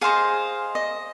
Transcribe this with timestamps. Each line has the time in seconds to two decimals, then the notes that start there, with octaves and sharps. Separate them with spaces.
0.01 G#4 C5 D#5 F5
0.75 D#5